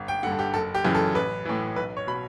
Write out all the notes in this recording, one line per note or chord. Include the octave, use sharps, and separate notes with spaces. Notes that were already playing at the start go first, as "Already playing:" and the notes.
Already playing: G1
G5
G2 D3 F#5
A4
G4
F#1 A4
G4
F#2 C#3 E3
A4
A1 B4
A2 E3
B1 B4
C#5
B2 B5